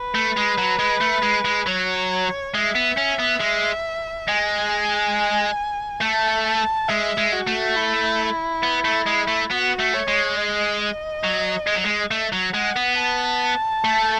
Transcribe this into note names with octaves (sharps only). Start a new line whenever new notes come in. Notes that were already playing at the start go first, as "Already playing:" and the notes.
Already playing: B4
A3
G#3
F#3
G#3
A3
G#3
G#3
F#3 C#5
G#3 E5
B3
C#4
B3
G#3
G#3 G#5
A3 A5
A5
G#3 E5
G#3
F#4
A3
E4
B3
A3
G#3
A3
B3 F#4
A3
C#5
G#3
D#5
F#3
G#3
F#3
G#3
A3
F#3
G#3 F#5
B3
A5
A3